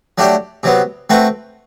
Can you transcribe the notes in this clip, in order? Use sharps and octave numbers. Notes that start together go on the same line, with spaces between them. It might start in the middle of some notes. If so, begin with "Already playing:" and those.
F#3 A3 D4 G4 D5
C3 F#3 B3
A3 C4 F#4 B4